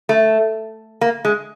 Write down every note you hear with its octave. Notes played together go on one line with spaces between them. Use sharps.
A3
A#3
G#3